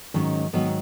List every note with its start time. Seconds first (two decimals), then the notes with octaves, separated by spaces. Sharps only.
0.14 G#2 D#3 F#3 C#4
0.53 G#2 D#3 F#3 B3